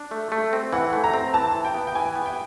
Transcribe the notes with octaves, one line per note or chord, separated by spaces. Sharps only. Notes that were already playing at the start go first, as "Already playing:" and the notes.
Already playing: D4
A3
A3
C4
E3 F#5
A3
A#5
C4
E3 A5
E3
G5
B3
G5
E3 G#5
B3
G5